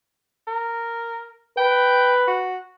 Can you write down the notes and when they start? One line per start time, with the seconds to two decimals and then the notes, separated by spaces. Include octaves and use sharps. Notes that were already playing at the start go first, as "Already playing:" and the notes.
0.47 A#4
1.58 B4 G5
2.28 F#4